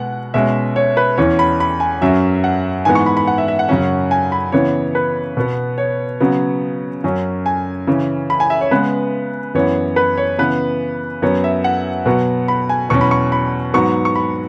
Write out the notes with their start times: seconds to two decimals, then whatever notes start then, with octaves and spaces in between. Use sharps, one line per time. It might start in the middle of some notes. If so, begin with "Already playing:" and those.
Already playing: B2 G#3 B3 F#5
0.34 B2 G#3 C#4 E5
0.76 C#5
0.97 B4
1.18 E2 E3 C#4 C#5
1.39 B5
1.60 B5
1.80 G#5
2.01 F#2 F#3 C#4 E5
2.44 F#5
2.85 G#2 E3 G#3 B3 G#5
2.95 C#6
3.06 B5
3.17 B5
3.28 F#5
3.38 E5
3.48 E5
3.59 F#5
3.69 F#2 C#3 F#3 C#4
4.11 G#5
4.32 B5
4.52 C#3 E3 B3 C#5
4.95 B4
5.37 B2 B3
5.78 C#5
6.21 C#3 F#3 B3
7.04 F#2 F#3 C#4
7.46 G#5
7.87 C#3 E3 C#4
8.30 B5
8.40 G#5
8.50 E5
8.61 C#5
8.71 C#3 G#3 B3 B4
9.55 F#2 E3 B3 C#5
9.96 B4
10.17 C#5
10.39 C#3 E3 B3 B4
11.22 F#2 F#3 B3 C#5
11.44 E5
11.64 F#5
12.06 B2 F#3 B3
12.48 B5
12.69 G#5
12.90 E2 B2 F#3 C#4 C#6
13.01 B5
13.11 C#6
13.32 B5
13.74 G#2 F#3 B3 C#6
14.05 C#6
14.15 B5